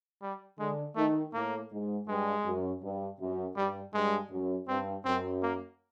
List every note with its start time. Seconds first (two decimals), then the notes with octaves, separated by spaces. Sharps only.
0.22 G3
0.59 D3 G#3
0.96 D#3 A3
1.33 A2 A#3
1.71 G#2
2.07 G2 G#3
2.45 F#2
2.82 G2
3.20 F#2
3.56 G2 G3
3.94 G2 G#3
4.30 F#2
4.68 G2 C4
5.05 F#2 C4
5.43 A#3